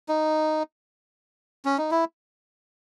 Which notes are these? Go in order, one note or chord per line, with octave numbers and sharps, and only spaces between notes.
D#4
C#4
D#4
E4